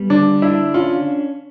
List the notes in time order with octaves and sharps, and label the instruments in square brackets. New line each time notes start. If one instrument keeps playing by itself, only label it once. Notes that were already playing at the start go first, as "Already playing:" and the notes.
Already playing: [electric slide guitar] G3 B3
[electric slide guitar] D3 [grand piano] D4
[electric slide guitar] D4 [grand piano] E4
[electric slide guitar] C#4 [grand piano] F4